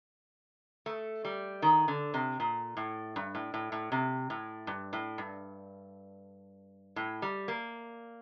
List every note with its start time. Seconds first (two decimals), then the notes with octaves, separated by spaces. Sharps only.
0.86 A3
1.25 G3
1.62 D#3
1.88 D3
2.14 C3
2.40 A#2
2.77 A2
3.16 G2
3.35 A2
3.54 A2
3.72 A2
3.92 C3
4.30 A2
4.67 G2
4.93 A2
5.18 G2
6.96 A2
7.22 G3
7.48 A#3